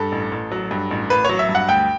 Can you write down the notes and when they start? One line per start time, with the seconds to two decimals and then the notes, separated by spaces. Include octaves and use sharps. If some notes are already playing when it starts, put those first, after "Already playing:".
Already playing: G2 A4
0.12 A1
0.32 A1
0.52 F#3
0.71 G2
0.91 A1
1.10 A1 B4
1.25 F#3 C#5
1.39 E5
1.49 G2
1.55 F#5
1.68 D2 G5